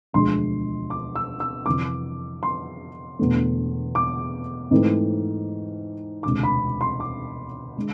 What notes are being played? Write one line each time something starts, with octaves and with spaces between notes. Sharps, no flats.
E1 D2 D3 F3 G#3 C6
D6
E6
E6
F2 C3 E3 D6
C6
E1 E2 D3 A3
D6
G#2 E3 A3 C4
E1 D2 C3 G#3 D6
B5
C6
D6
D3 G#3